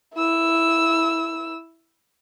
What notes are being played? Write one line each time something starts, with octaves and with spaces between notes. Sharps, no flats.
E4 E6